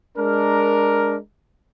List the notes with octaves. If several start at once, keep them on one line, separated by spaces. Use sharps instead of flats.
G#3 D4 A#4